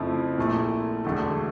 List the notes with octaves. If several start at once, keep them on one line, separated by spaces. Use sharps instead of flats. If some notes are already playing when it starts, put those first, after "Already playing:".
Already playing: F2 C#3 F3 A3 E4
A#1 A#2 A3 E4
E1 D2 D3 A3